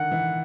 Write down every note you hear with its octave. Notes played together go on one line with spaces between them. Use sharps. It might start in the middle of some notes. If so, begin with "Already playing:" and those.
Already playing: D3 D#3 F#5
E3